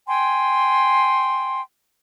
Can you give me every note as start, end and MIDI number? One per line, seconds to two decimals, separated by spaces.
0.07 1.61 79
0.07 1.61 80
0.07 1.61 84